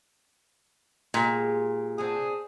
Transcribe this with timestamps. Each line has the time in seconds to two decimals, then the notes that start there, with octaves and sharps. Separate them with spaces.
1.14 A#2 G#3 G4 G#4
1.98 C4 D4 F#4 G#4